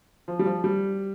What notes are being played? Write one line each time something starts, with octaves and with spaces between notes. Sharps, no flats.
F3
G3
F3
G3